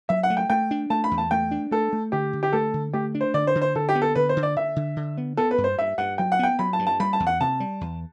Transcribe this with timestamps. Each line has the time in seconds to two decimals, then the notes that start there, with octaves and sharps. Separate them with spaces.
0.09 F#3 E5
0.23 F#5
0.30 A3
0.37 G5
0.50 A3 G5
0.71 D4
0.90 A3 A5
1.04 B5
1.11 E2
1.18 A5
1.31 A3 G5
1.51 D4
1.71 A3 A4
1.93 A3
2.12 D3 G4
2.33 D3
2.43 G4
2.53 A3 A4
2.74 D3
2.93 A3 G4
3.15 D4
3.21 C5
3.34 D3 D5
3.47 C5
3.55 D3
3.62 C5
3.75 D3 A4
3.89 G4
3.95 B3
4.02 A4
4.15 D3 B4
4.29 C5
4.37 D3
4.43 D5
4.56 D3 E5
4.76 D3
4.96 D3
5.18 B3
5.37 B3 A4
5.51 B4
5.58 G2
5.64 C5
5.78 G2 E5
5.98 G2 F#5
6.18 F#3 G5
6.32 F#5
6.39 B3 G5
6.59 F#3 B5
6.73 A5
6.79 G2
6.87 A5
7.00 G3 B5
7.13 A5
7.20 E2
7.27 F#5
7.40 C3 A5
7.60 G3
7.81 E2